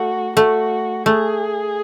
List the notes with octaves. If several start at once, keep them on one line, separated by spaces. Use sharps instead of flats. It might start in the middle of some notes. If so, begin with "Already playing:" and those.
Already playing: A3 F#4
A3 F#4
A3 G#4